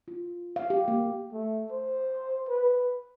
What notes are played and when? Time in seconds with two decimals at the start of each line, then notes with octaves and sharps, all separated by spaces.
0.08 F4
0.56 F5
0.70 G4
0.88 A#3
1.32 A3
1.71 C5
2.49 B4